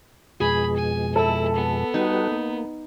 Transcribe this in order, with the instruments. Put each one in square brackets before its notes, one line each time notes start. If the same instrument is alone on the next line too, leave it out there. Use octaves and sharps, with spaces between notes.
[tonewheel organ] F2 B2 G#3 [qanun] G#4 [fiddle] B5
[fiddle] G#5
[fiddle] E4 [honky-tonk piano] A4
[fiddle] B3
[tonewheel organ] G3 F#4 B4 [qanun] D#4
[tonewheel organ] A#3